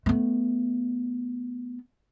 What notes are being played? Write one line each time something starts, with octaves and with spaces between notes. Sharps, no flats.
A3 B3